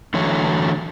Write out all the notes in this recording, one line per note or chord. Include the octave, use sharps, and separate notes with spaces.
D3 E3 F#3 A3 C#5